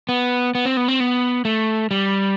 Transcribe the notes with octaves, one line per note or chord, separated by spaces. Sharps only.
B3
B3
C4
B3
C4
B3
A3
G3